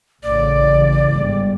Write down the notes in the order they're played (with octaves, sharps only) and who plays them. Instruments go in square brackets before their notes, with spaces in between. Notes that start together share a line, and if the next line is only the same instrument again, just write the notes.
[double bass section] A1 D2 C#3 [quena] D5
[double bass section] G1 G#2 G3